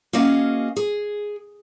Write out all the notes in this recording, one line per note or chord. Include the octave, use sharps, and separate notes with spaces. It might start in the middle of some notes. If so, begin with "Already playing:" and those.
A#3 C#4 F#4 G#4 D#5 F5
G#4